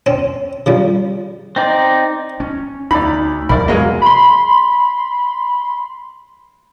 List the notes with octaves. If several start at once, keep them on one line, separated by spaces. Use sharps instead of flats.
C4 C#4
C#3 F3 G3
C4 D#4 D5
C#4
D2 D#4 D5 B5
E2 C3 A#4 D5 B5
F#3 G#3 A#3 D#5
B5 C6